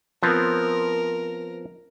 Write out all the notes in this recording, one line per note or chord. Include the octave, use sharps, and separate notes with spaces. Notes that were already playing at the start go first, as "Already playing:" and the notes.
F3 B3 C4 A#4